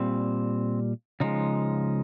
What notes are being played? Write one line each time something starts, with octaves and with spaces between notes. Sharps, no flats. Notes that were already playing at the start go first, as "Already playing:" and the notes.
Already playing: A#2 G3 C4
C#3 F3 G#3 D#4